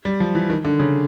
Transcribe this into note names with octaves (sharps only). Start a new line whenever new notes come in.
G3
F3
E3
D#3
D3
C#3